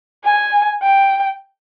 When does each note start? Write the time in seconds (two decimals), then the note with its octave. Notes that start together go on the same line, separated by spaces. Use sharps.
0.24 G#5
0.82 G5